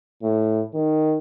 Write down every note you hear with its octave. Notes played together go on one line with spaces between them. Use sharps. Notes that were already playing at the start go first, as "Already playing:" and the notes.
A2
D#3